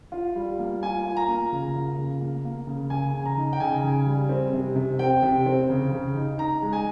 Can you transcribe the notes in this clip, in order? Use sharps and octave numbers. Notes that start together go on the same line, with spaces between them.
F4
G3
A#3
F4 G#5
F4
A#5
A#3
C#3
F4
C#3
A#3
A#3
C#3
C#3 G#5
C#3
A#5
D#4
G5
C#3 G#5
C#3
G3
C4
C3
C3
C4 G5
C3
C4
C#3
C#3
D#4
D#4 A#5
G#3
G#5